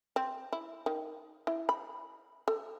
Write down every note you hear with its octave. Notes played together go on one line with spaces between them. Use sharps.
C4
E4
D#3
E4
B5
A4